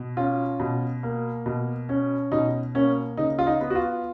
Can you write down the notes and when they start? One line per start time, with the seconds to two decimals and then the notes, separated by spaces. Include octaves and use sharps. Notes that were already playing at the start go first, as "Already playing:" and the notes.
Already playing: B2
0.17 C#4 F4
0.60 B2
1.03 A#3
1.46 B2
1.89 C#4
2.32 B2 D#4
2.75 A#3 C#4
3.17 C#3 D#4
3.39 F4
3.47 D#4
3.61 B3
3.70 F#4
3.75 F4